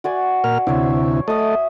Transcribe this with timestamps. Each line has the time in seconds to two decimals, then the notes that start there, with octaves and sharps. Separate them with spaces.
0.04 F#4 D5 G#5
0.44 A#2 A#4 F6
0.67 D2 C3 E4 C#5 C6 D6
1.28 A3 A4 D#5 E5 D#6